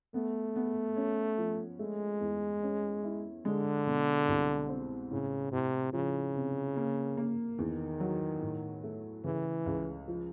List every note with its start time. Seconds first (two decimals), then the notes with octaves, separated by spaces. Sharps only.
0.14 A3 B3
0.56 B3
0.97 C#4
1.38 F3
1.79 G#3 A3
2.20 E2
2.63 C#4
3.04 E4
3.45 D3 G#3
3.87 B2
4.28 C2
4.69 C4
5.11 A2 C#3
5.51 A2 C3
5.93 C#3 F3
6.35 C3
6.76 A#3
7.17 A#3
7.58 E2 D#3
8.00 F#3
8.41 A2
8.84 A3
9.24 C#3 E3
9.66 C#2
10.08 F3